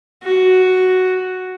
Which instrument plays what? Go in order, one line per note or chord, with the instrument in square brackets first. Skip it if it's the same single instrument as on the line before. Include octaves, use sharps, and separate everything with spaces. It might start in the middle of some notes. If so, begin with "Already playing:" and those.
[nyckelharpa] F#4